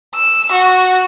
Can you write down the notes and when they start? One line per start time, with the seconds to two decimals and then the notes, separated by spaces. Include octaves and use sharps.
0.14 E6
0.51 F#4